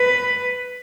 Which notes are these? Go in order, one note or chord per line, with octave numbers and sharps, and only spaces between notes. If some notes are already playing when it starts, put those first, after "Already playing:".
Already playing: B4